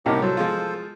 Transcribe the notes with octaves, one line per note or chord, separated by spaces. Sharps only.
C2 A2 C3 A#3 D#4 G4
F#3 A4 C5
F3 G#3 F4